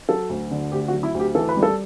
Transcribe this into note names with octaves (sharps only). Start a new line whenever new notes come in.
F#3 A4
D2
D3
D2 G4
F#4
F#3
E4
D2
G4
E3 A4
B4
G3
A4